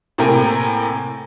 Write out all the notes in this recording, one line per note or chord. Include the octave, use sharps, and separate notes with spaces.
A2 C3 A#3 A#4 G5 G#5